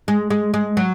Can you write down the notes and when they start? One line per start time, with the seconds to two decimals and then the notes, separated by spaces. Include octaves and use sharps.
0.08 G#3
0.30 G#3
0.54 G#3
0.77 F#3